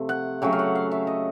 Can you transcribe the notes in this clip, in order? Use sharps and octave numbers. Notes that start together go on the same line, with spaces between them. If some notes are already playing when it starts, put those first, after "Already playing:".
Already playing: C3 F3 A3
F#5
C#3 F#3 A3 G5
F5
F#5
F5
E5
D#5